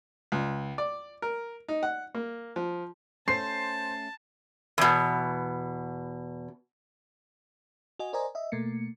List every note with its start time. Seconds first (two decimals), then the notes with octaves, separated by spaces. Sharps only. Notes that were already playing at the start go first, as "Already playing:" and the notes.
0.32 C#2
0.78 D5
1.22 A#4
1.68 D#4
1.83 F#5
2.15 A#3
2.56 F3
3.28 A3 C#4 C5 A5 C7
4.78 E2 B2
7.99 F#4 D#5 G#5
8.13 A#4 C5 D5 D#5 G#5 A#5
8.35 D#5 E5
8.52 B2 A3 A#3 C#7